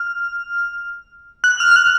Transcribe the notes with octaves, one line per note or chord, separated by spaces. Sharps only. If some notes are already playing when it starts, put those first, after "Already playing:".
Already playing: F6
F#6
F6
F6
F#6